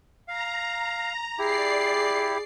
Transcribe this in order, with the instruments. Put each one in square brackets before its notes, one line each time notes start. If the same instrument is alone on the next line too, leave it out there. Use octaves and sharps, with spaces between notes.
[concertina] F5 [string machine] A#5
[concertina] E4 G4 [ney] G#4 [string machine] D5 C7